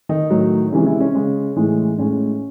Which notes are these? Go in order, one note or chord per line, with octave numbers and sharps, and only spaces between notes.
D#3 D#4
A2 F#3
C3 E3 G#3 C#4
E3 E4
C#4
C#3 G#3
A2 E3 G#3
A2 G#3 C#4